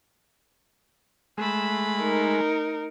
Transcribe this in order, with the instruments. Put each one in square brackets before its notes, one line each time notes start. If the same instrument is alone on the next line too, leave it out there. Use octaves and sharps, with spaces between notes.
[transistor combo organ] G#3 [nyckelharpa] A3 B5
[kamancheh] D#4 A#4